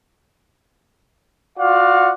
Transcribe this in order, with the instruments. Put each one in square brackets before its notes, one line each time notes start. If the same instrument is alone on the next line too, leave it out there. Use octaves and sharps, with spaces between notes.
[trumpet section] F4 F#4 D5 F5 F#5